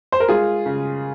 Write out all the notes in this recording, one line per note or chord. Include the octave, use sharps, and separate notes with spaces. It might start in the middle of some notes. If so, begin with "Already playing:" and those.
C5
A#4
G#3 F4 G#4
C#3